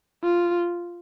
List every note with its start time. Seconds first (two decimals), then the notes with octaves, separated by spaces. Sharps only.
0.23 F4